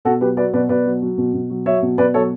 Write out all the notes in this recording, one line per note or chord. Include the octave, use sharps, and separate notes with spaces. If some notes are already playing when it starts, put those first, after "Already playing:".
B2 F#4 A4
F#3 G4 B4
F#3 B4 D5
B2 B4 D5
B2 B4 D5
F#3
F#3
B2
B2
F#3
F#3 C#5 E5
B2
B2 B4 D5
F#3 A4 C#5